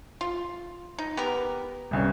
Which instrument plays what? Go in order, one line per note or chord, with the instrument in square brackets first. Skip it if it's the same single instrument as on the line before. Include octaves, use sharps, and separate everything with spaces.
[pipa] F4
D#4
B3 G4 A#4
[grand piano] G1 C2 C#4